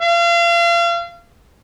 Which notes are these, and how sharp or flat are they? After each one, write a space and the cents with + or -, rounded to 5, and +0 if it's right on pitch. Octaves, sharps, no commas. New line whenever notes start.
F5 -35